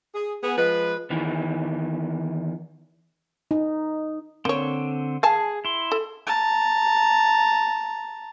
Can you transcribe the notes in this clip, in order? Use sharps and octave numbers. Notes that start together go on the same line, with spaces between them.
G#4
B3 G#4
F3 G#3 B4
E2 D#3 E3
D#4
D3 A#3 C4 C#5
G#4 F5 G#5 A5
E4 C6
A4
A5 A#5